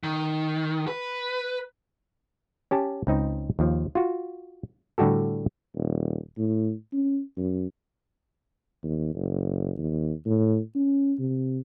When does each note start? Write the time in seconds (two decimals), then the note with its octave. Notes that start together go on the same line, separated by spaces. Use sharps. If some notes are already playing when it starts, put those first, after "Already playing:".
0.03 D#3
0.88 B4
2.71 C#4 G4 A5
3.07 C#2 C4 D#4 D#5
3.59 D#2 F3
3.95 F4 F#4
4.98 A2 D3 G3 F#4 G4 A4
5.75 D#1
6.38 A2
6.93 C#4
7.37 F#2
8.83 D#2
9.15 F#1
9.78 D#2
10.26 A2
10.75 C#4
11.19 C3